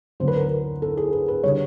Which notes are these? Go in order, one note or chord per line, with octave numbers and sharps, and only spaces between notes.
D2 D3 F#3 C5
B4
A#4
B4
A4
G#4
B4
B4
D3 G3 C#5